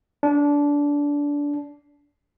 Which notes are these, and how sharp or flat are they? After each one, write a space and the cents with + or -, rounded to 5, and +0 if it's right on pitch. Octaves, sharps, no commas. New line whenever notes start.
D4 -20